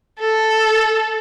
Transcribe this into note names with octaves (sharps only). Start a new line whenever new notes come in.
A4